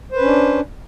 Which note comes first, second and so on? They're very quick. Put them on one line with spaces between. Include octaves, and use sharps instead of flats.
C5 B4 C#4 D4